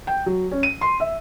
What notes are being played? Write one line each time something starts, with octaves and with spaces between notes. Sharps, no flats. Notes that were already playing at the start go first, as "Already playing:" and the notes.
G5
F#3
C#4
D#7
C6
E5